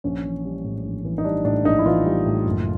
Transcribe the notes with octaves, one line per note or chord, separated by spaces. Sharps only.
A#1 C#4
E3
G3
A2
A#1
E3
D#4
G3 D4
A2 D4
A#1 D#4
E4
E3 F4
G3
A2
F#1